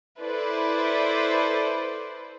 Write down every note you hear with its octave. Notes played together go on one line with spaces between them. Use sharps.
E4 A4 B4 C5 D5